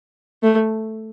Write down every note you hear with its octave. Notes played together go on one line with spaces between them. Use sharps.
A3